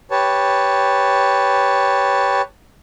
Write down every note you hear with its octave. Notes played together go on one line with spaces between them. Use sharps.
G4 B4 C#5 A5